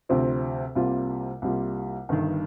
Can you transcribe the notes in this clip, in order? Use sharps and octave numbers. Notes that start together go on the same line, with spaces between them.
D2 C3 F3 C4
C2 C3 G3 A#3 F4
C2 C3 G3 A#3 F4
G1 G2 D#3